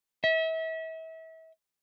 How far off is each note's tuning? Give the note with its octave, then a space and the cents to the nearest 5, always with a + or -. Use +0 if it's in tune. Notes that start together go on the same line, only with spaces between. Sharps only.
E5 -35